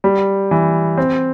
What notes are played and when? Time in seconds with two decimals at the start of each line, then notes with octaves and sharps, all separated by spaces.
0.04 G3
0.51 E3
0.97 C4